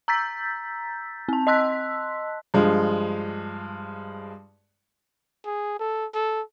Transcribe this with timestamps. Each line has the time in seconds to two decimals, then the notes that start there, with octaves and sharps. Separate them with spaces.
0.08 A#5 E6 G6 A6 B6
1.29 C4 A5
1.47 D#5 A5 C6 E6 F#6 B6
2.54 G2 F3 G#3
5.45 G#4
5.79 A4
6.14 A4